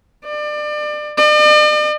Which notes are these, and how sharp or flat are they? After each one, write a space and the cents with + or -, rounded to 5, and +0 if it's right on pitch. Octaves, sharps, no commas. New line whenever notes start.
D5 +30
D5 +45